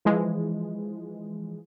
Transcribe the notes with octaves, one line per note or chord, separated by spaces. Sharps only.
E3 F3 G#3